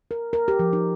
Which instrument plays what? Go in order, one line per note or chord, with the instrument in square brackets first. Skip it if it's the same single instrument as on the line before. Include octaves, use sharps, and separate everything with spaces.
[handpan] A#4
A#4
G4
F3
D#4